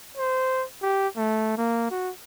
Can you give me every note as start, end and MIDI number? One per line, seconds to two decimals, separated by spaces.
0.17 0.65 72
0.82 1.08 67
1.17 1.54 57
1.57 1.87 58
1.91 2.11 66